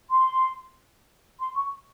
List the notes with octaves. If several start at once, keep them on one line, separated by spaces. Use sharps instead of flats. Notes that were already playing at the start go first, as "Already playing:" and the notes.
C6
C6
C#6